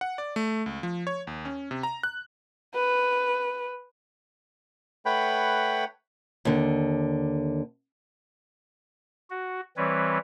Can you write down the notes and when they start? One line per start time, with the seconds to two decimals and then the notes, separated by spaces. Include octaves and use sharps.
0.01 F#5
0.18 D5
0.36 A3
0.66 C#2
0.83 F3
1.07 C#5
1.27 D#2
1.45 C#4
1.71 C3
1.83 A#5
2.03 F#6
2.74 B4
5.06 A3 B4 C#5 F#5 G5 B5
6.45 D#2 D3
9.30 F#4
9.77 E3 G3 C4 B4 C#5